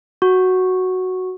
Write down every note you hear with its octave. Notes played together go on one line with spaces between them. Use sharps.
F#4